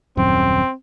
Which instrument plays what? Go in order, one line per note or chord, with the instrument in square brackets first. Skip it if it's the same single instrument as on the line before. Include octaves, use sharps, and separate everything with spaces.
[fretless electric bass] D#1 F#2 [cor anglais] C4